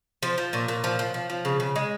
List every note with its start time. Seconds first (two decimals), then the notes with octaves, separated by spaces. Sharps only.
0.23 F3 C5
0.38 F3
0.53 A#2 C#5
0.68 A#2
0.84 F3
0.99 F3
1.14 F3
1.30 F3
1.45 C#3
1.60 C#3
1.76 G#3